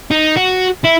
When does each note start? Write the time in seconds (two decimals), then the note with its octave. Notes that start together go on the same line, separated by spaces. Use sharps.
0.11 D#4
0.37 F#4
0.84 E4